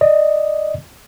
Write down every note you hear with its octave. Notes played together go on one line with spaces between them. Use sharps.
D5 D#5